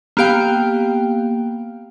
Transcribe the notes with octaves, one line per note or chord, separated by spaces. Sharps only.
A#3 B3 G4 F5 G5